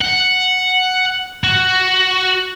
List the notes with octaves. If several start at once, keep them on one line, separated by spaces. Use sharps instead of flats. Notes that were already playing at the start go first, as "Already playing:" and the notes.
F#5
F#4